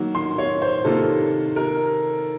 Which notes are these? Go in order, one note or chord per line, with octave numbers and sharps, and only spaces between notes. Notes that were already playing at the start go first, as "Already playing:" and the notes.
Already playing: D#3 F#3 A#3
C6
C#5
C5
C3 D#3 A#3 F4 A4
A#4